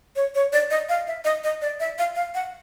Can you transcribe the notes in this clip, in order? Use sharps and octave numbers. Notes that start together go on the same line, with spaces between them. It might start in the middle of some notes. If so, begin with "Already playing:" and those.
C#5
C#5
D5
D#5
F5
E5
D#5
D#5
D5
E5
F5
F5
F#5